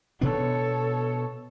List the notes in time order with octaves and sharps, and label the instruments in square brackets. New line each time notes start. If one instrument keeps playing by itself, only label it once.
[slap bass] B2 B3 D4 [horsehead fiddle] A4 C#5